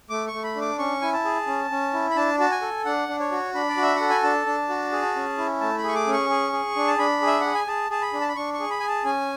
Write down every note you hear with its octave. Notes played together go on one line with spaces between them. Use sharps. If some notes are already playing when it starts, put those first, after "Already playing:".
A3 D6
C#6
A3
B5
D4
D6
C#4 C#6
E4 G#5
A5
G#4
C#4
C#4
E4
B5
D4 A5
F#4 A5
G#5
A4
D4 F#5
D4
C#5
F#4
D4 B5
D5
F#4
E5
A4 F#5
G#5
D4 A5
D4
F#4
G#4
C#4
E4
A3 A5
B5
G#4 C#6
D6
C#4
C#6
G#4
G#4
D4
A5
D4 B5
G#4
E5
G#4 F#5
G#5
G#4 A5
G#4 A5
B5
D4
A5
B5
D4 C#6
C#6
G#4
B5
G#4 G#5
A5
C#4 G#5